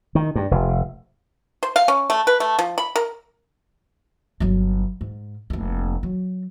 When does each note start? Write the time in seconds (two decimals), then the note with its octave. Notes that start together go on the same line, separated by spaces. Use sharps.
0.15 D#3
0.35 G2
0.51 F1
1.63 C5
1.76 F5
1.88 C#4
2.10 A3
2.27 B4
2.40 A3
2.59 F3
2.78 B5
2.96 A#4
4.40 G1 F#3
5.01 G#2
5.50 F1 A#3
6.03 F#3